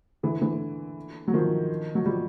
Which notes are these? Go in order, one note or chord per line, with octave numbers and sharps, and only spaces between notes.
D3 E3
D3 E3
F#3
D#3 F3
F#3
F3 G3